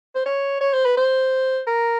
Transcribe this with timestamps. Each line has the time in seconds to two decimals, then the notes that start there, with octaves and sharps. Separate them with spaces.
0.16 C5
0.26 C#5
0.61 C#5
0.73 C5
0.85 B4
0.97 C5
1.67 A#4